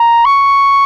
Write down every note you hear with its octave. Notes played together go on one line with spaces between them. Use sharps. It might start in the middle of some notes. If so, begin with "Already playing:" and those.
Already playing: A#5
C#6